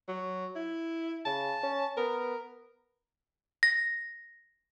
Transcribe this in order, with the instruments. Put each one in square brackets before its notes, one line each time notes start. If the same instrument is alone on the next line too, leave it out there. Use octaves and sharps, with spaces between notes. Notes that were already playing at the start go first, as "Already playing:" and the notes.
[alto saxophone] F#3
E4
[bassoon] C#3 [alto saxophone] A5
[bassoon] C#4
[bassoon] B3 [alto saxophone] A#4
[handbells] A#6